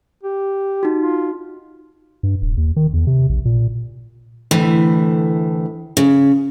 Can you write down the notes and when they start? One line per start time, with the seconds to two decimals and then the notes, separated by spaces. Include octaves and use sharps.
0.24 G4
0.83 D#4 F#4
0.99 F4
2.23 G2
2.42 D1
2.57 D#2
2.76 D#3
2.93 E2
3.07 C3
3.29 A#1
3.45 A#2
4.51 D2 A2 E3
5.97 C#3